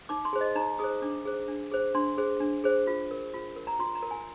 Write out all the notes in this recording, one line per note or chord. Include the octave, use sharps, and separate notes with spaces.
D#4 D6
C6
G#4 C5
D#5
D#4 A#5
G#4 C5 D#6
D4 D6
G#4 C5
D4
G#4 C5
D4 C6
G#4 C5
D4
G#4 C5
F4
A#4
F4
A#4
A#5
F4 C6
A#5
A#4
G#5